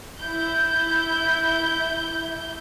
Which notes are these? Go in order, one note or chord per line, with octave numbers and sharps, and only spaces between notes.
E4 G6